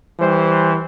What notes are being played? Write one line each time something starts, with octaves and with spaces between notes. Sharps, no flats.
E3 G3 C5